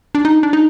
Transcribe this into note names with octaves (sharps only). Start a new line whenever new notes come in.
D4
D#4
D4
D#4